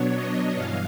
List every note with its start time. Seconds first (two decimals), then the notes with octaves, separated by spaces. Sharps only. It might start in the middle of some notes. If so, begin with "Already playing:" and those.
Already playing: B2 F#3 B3 D4 C#5
0.15 D#5
0.55 G2 E3 F5